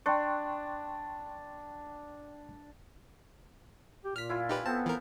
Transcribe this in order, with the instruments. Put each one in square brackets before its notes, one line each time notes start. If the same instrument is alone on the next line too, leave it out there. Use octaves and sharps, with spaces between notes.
[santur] D4 [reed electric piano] G5 C6 C#6
[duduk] G4
[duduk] A#2 [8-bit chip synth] F6 B6
[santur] E4 F4 G#5
[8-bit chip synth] D#4 G4 B4
[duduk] B3 [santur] C4 A4 [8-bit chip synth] A5
[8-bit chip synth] E3 A#4